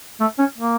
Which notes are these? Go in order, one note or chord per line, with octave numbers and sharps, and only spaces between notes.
A3
C#4
A#3